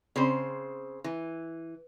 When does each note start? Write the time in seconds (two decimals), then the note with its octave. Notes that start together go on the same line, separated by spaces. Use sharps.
0.16 C#3 C4 C5
1.04 E3